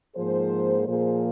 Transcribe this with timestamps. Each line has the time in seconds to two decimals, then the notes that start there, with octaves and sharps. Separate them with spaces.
0.15 G#2 F3 A#3 G#4 C5
0.87 A#2 F3 A#3 G#4 C5